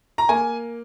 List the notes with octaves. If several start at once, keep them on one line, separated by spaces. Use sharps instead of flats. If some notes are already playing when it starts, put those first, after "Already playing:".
A#5
A#3 G#5